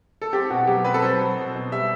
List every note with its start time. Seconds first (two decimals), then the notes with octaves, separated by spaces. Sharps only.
0.22 A4
0.33 C4 G4
0.50 B2 F#4
0.67 F#3 G4
0.85 C4 B4
0.94 A4
1.02 F#3 C5
1.20 F#3
1.37 B2
1.55 B2
1.72 G3 E5